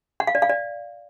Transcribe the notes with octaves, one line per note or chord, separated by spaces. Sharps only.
F#5
F5
D5
F5
D5